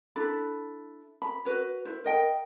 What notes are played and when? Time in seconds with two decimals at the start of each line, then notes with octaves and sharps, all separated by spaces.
0.16 D4 E4 A4 B5
1.22 B5
1.45 F#4 B4 C#5
1.85 E4 C5
2.04 A#4 D#5 G5